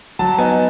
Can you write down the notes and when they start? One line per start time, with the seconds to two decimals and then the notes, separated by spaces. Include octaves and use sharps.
0.19 F#3 A5
0.38 B3 D#4 G#5